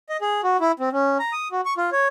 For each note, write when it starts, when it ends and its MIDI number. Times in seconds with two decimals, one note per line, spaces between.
0.09 0.17 75
0.21 0.41 68
0.43 0.57 66
0.60 0.72 64
0.79 0.89 60
0.92 1.18 61
1.20 1.32 82
1.33 1.48 87
1.52 1.61 66
1.65 1.74 85
1.77 1.90 65
1.92 2.08 73